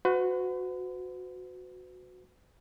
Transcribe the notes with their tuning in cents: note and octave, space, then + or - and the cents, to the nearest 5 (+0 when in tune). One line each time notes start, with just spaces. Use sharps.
F#4 -15 B4 +45